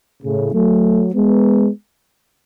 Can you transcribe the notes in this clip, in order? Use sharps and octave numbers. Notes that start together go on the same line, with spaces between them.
A2 C#3
F#3 A3
G#3 B3